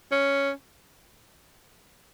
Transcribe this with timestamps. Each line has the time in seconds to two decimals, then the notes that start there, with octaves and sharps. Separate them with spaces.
0.11 C#4